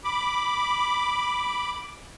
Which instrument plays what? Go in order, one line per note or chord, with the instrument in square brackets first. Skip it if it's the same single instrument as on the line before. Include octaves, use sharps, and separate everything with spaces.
[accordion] B5 D6